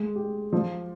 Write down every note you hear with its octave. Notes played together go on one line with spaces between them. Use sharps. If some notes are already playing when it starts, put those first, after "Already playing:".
Already playing: G#3
G4
F3